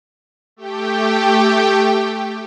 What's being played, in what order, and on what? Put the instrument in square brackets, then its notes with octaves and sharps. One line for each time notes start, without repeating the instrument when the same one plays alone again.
[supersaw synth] A3 G4 G5